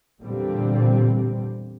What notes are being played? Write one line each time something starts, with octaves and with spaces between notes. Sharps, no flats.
E2 A#2 D3 G3 C4